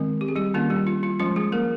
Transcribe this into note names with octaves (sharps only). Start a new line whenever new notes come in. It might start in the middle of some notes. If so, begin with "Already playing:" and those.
Already playing: D#3 G#3 C4
G4
G#4
G3 G4
D#3 A#3 C#4 F4
G3 G4
F4
F4
F3 G#3 C#4 F4
G#3 G#4
A#3 A#4